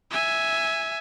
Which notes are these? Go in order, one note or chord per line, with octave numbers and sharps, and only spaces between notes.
E5 G#5